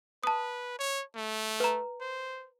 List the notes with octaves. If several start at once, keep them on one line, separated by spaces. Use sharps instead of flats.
B4 A5 D#6
C#5
A3
B4 A#5
C5